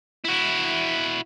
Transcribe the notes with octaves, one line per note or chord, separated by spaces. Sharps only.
E4 F#4